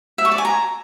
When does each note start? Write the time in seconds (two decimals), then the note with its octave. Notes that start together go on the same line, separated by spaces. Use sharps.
0.18 E5
0.25 C#6
0.32 D5
0.38 G#5
0.45 A#5